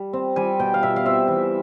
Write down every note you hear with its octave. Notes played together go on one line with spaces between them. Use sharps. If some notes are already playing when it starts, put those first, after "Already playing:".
Already playing: G3
C4
G3 G#5
B2 G5
F5
B2 E5
F5
C4 E5
E3